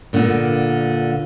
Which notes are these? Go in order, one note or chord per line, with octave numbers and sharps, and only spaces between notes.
A#2 D3 A#3 B3